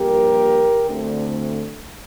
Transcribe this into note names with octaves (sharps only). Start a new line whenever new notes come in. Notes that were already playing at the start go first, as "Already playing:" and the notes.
Already playing: G2 F3 A#3 G4 A#4
D2 D3 A3 C4